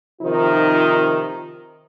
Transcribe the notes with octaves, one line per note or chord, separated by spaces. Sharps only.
C3 D#3 F3 D#4 F4